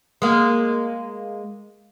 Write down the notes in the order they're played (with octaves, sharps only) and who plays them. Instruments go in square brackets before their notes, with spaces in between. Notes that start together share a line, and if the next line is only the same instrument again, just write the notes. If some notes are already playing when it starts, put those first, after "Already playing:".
[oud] G#3 A#3